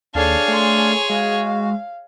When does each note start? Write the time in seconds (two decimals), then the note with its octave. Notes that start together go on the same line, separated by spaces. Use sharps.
0.15 D#2 D4 G#4 A4 C#5 F5 A5
0.48 A3 G#5 C6
1.10 G#3 F#4 F5